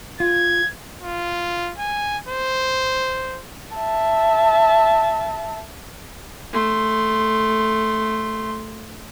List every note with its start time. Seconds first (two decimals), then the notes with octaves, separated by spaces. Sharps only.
0.20 F4 G#6
1.03 F4
1.78 G#5
2.29 C5
3.76 E5 A5
6.53 A3 C6